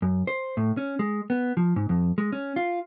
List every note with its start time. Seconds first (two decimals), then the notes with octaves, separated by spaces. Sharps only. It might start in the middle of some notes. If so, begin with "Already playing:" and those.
0.02 F#2
0.27 C5
0.57 A2
0.77 C#4
0.99 G#3
1.30 B3
1.57 F3
1.76 G#2
1.89 F2
2.18 G#3
2.32 C#4
2.56 F4